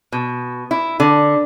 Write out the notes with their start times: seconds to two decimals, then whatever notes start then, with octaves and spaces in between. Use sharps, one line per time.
0.12 B2
0.71 E4
1.00 D3